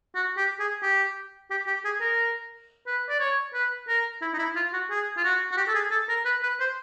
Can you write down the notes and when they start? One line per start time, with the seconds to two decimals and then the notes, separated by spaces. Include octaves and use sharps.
0.15 F#4
0.37 G4
0.60 G#4
0.82 G4
1.51 G4
1.67 G4
1.85 G#4
2.01 A#4
2.87 B4
3.09 D5
3.20 C#5
3.54 B4
3.88 A#4
4.21 E4
4.34 D#4
4.39 E4
4.55 F4
4.73 F#4
4.90 G#4
5.17 F4
5.24 F#4
5.51 F#4
5.57 G4
5.68 A4
5.74 G#4
5.91 A4
6.09 A#4
6.25 B4
6.43 B4
6.60 C5